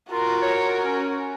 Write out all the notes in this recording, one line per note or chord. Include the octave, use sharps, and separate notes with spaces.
F4 F#4 A#4
C#5
C#4